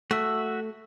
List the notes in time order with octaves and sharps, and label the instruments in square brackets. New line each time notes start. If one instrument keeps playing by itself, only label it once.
[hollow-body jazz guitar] A3 [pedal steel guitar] F#4 E5